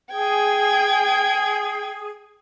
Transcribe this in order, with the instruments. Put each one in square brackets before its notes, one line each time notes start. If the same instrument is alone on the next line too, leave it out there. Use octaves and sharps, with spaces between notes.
[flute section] G#4 [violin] G5 G#6